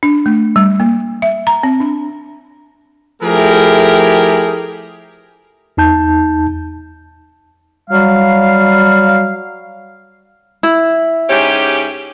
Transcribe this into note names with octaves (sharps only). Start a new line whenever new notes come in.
D4
A3
G3
A#3
E5
A#5
C4
D4
F3 A3 E4 G4 G#4 A#4
E2 D#4 A5 G6
F#3 G3 F5
E4
G#2 C#4 G4